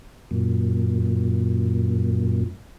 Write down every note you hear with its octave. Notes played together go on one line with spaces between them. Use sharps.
F#2 A#2